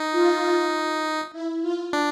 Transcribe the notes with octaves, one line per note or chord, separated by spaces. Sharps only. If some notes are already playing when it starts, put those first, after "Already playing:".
Already playing: D#4
F4
E4
F4
D4